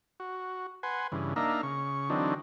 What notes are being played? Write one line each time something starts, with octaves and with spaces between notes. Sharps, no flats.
F#4
B4 F#5 G#5 C6
G2 C#3 E3
A#3 D4 D#4 E5 F5 A#5
C#3 C#6
D3 E3 F#3 C4 D4 D#4